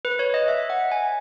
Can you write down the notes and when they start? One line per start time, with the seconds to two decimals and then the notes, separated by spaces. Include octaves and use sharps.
0.05 B4
0.19 C#5
0.34 D#5
0.48 E5
0.70 F#5
0.92 G#5